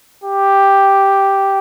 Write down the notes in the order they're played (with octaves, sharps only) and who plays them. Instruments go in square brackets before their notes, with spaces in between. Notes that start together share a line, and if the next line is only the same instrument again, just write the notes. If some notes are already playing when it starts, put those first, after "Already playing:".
[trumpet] G4